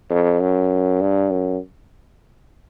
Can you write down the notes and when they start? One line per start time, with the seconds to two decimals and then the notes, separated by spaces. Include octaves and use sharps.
0.10 F2
0.40 F#2
1.01 G2
1.31 F#2